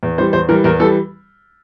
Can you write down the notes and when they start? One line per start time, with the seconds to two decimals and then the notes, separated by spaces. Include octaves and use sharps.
0.03 E2
0.18 E3 G3 C5
0.33 E2 C5
0.49 E3 G3 A#4
0.64 E2 A#4
0.80 E3 G3 A4